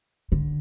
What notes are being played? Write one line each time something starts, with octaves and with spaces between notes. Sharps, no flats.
D3